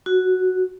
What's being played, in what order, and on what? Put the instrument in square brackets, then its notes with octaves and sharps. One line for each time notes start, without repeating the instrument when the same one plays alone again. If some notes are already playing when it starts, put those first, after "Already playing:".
[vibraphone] F#4